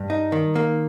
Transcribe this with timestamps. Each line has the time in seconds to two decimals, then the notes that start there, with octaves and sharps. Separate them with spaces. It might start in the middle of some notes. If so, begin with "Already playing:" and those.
Already playing: G2
0.10 D#4
0.32 D#3
0.56 A#3